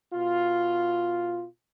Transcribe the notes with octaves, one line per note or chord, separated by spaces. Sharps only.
B2 F4